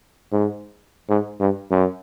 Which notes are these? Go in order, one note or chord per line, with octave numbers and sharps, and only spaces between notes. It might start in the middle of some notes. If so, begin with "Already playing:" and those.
G#2
G#2
G2
F#2